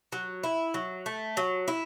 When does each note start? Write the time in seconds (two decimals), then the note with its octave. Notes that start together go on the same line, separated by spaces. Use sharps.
0.12 F#3
0.43 E4
0.74 F#3
1.06 A3
1.37 F#3
1.68 E4